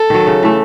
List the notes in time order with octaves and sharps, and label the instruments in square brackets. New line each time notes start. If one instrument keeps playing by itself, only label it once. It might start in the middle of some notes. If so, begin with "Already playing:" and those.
Already playing: [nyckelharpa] A4
[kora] D#3 F#3
C#3
E3 A3